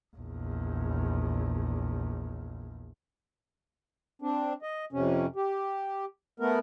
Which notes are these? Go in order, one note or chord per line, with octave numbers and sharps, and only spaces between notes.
A#1 E2
C4 D4
D#5
F2 C3 C#4
G4
A3 B3 A#4